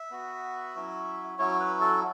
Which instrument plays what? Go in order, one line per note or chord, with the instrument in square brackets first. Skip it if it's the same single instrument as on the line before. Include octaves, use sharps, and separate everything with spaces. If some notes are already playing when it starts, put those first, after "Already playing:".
Already playing: [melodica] E5
B3 F#4
F#3 C#4 E4
F#3 C#4 E4 C#5
B4
A4